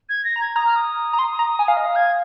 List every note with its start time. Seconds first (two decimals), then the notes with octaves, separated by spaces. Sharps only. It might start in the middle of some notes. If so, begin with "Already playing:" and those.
0.09 G#6
0.24 A#6
0.36 A#5
0.41 G#6
0.56 A#5 D#6
0.66 F6
0.76 D#6
1.13 A#5
1.19 C6
1.39 A#5
1.59 G#5
1.68 F5
1.77 D#5 D#6
1.85 F5
1.96 G#6